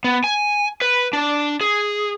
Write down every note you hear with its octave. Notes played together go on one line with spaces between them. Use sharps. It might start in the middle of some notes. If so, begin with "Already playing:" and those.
B3
G#5
B4
D4
G#4